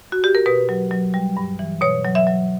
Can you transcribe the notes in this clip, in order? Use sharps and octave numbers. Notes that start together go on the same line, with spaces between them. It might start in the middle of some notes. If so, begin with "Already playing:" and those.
F#4
G4
A#4
B2 B4
F#3
F#3
G3
G2
E3
B2 C#5
F#3
E5
F#3